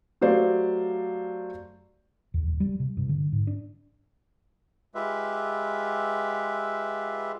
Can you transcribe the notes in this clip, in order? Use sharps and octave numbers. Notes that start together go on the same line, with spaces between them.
F#3 A3 G4 C5 D5 F5
E2
D#1
G3
C3
G2
D3
G#2
D4
G#3 F4 G4 B4 E5